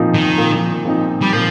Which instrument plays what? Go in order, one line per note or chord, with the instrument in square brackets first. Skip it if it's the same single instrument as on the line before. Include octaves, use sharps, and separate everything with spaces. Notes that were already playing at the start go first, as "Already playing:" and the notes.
Already playing: [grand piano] A#2 F3 C4 D#4
[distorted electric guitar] D#3
[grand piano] A#2
F3 C4 D#4
[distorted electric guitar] G3
[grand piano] A#2 [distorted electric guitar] F3